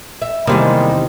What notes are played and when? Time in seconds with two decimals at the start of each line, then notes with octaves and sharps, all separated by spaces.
0.22 E5
0.47 E2 C3 D#3 G3 G#3 A#3